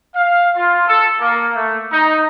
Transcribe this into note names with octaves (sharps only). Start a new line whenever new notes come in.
F5
F4
A4
A#3
A3
D#4